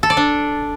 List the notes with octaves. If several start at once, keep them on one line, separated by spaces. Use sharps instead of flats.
A4
D5
D4